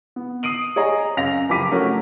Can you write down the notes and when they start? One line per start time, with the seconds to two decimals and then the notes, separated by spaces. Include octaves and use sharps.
0.16 B3
0.43 D#6 C7 D7 D#7 F#7
0.76 G#4 C#5 D#5 A#5
1.17 F#2 C#3 F5 A#6 F7
1.49 F#1 F3 G4 D6 B6 D#7
1.71 A3 C#4 F#4 A#4